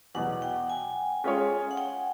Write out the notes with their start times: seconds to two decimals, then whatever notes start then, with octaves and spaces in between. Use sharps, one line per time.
0.15 E2 B2 F#3 F#5
0.42 G5
0.69 G#5
1.24 G#3 C#4 F4 G#4 C#5
1.71 F#5
1.77 G5